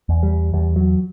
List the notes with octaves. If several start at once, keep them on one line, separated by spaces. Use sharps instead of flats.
E2
G3
E2 G3
F#3